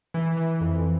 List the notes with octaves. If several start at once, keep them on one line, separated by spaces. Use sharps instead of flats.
E3
E3
F2